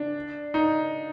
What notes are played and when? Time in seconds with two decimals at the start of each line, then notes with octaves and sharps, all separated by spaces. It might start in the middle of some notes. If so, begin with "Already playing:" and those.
Already playing: D4
0.54 D#4